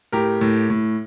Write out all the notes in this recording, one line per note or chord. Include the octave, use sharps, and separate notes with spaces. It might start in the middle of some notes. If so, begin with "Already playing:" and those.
A2 G4 A#4
A2
A2